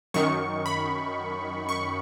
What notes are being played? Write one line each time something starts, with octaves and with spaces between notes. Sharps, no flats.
F#2 D#3 C#6
B5
C#6